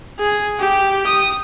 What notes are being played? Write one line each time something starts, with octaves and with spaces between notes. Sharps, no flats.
G#4
G4
D#6